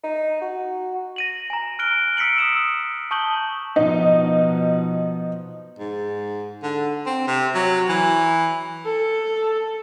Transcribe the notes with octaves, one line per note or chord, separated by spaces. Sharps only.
D#4
F#4
A#6 D#7 F#7
G#5 A#5
F6 F#6 D7 G7
E6 B6 C#7 D7 F#7
D#6 E6 E7
A5 C#6 D#6 G6 F#7 G7
B2 F3 D#4
G#2
D3
C4
C3
F#3
E3
A4